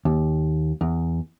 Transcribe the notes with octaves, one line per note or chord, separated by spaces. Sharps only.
D#2
E2